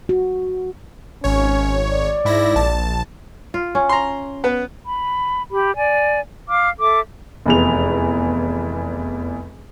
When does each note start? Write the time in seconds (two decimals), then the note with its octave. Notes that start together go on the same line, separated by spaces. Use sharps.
0.09 F#4
1.24 G#1 C#4 C#5
1.92 D5
2.25 G#2 E4 A#6
2.55 A#1 A5
3.54 F4
3.75 C#4
3.89 A#5 C6
4.44 B3 B4
4.85 B5
5.52 G4 B5
5.76 D5 G#5
6.49 F5 D6 F6
6.79 A4 E5 D6
7.46 F1 E2 F7